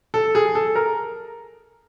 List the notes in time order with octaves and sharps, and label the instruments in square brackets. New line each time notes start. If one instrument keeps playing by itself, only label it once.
[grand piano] A4
G#4
A4
A#4